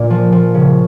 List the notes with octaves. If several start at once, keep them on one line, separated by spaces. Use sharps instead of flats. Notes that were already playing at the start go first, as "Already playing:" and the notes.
Already playing: A#2 A#3
F3
F3
C#3